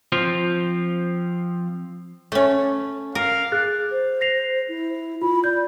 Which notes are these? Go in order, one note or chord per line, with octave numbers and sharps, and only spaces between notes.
F3 C4 F4
A3 C#4
A#4 F5
G#4 F#6 A6
C5
A#6 C7 F7
E4
F4 B5
D5 G6